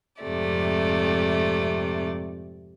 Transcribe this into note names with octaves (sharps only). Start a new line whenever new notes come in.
F2 G#2 C3 A3 D5